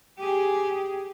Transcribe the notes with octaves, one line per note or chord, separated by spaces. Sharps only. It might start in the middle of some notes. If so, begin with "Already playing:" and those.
G4 G#4